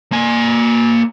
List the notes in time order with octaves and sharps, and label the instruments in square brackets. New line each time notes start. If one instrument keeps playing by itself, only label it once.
[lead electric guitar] A#3 G#5